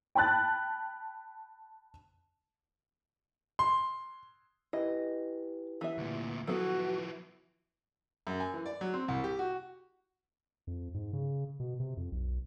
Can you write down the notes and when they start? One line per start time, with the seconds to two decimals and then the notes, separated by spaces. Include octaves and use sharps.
0.15 G5 A5 B5 F#6 A6
3.59 C6
4.73 E4 G4 B4 D#5
5.81 E3 B3 E5
5.98 D2 A#2
6.47 F3 F#3 B3 E4 F#4 A4
8.27 F#2
8.40 G#5
8.54 E3
8.66 D5
8.81 F#3
8.94 C4
9.08 C2
9.24 G4
9.39 F#4
10.67 F2
10.94 G#2
11.13 C#3
11.60 B2
11.80 C3
11.97 F2
12.12 B1